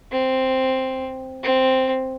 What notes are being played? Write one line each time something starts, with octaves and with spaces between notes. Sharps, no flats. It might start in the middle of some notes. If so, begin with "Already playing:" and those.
C4
C4